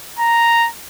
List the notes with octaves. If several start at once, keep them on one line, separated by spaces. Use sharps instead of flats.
A#5